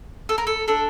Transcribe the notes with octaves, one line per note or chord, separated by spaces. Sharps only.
A4
A#4
A4
D4 A4